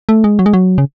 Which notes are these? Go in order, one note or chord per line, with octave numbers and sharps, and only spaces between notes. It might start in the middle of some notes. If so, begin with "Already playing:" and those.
A3
G#3
F#3
G#3
F#3
C#3